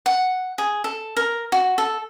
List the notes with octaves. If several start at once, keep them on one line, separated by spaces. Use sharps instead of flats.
F#5
G#4
A4
A#4
F#4
A4